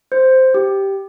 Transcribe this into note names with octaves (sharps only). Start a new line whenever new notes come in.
C5
G4